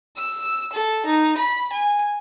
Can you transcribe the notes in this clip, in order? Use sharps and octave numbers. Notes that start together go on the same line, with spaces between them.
E6
A4
D#4
B5
G#5